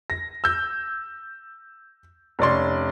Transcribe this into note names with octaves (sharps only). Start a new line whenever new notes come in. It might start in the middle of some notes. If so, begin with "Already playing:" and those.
A#6
E6 G6
F1 C#4 D5 C6